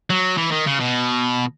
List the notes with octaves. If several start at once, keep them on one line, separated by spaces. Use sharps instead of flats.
F#3
E3
D#3
C#3
B2